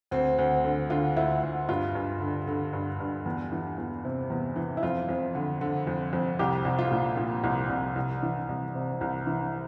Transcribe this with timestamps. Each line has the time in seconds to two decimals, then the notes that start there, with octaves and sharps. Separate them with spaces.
0.11 D2 C4
0.38 D2
0.65 D3
0.90 D3 F4
1.17 D2 E4
1.43 D2
1.69 G2 F4
1.95 G2
2.20 D3
2.47 D3
2.73 G2
3.00 G2
3.26 E2
3.52 E3
3.78 E2
4.05 C3
4.30 E2
4.56 E3
4.77 E4
4.83 F2 F4
5.09 F2
5.35 D3
5.61 D3
5.87 F2
6.13 F2
6.39 C2 G4
6.65 C2
6.79 F4
6.91 A#2
7.17 A#2
7.44 C2
7.69 C2
7.96 C2
8.23 E3
8.49 C2
8.75 C3
9.01 C2
9.27 E3